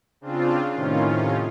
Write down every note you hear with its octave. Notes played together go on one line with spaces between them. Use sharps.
C#3 C4 D4 F4
A2 C3 D#3 C#4 F4